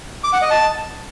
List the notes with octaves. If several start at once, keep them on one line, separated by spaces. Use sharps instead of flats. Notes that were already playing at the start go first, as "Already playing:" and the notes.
D6
F#5
D#5
A5